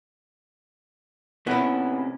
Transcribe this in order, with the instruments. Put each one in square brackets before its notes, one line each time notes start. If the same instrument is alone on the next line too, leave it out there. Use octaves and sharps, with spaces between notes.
[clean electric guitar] A2 C3 C#4 [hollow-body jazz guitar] B3 E4